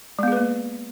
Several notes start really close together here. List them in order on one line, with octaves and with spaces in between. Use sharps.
G#3 B3 G#4 B4 A#3